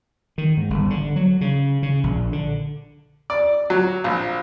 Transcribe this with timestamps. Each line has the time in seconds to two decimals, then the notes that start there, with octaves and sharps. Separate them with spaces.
0.38 D#3
0.57 G#2
0.70 G1
0.90 D3
1.16 F#3
1.41 C#3
1.83 C#3
2.04 A#1
2.33 D3
3.30 D5
3.70 F#3
4.04 A#1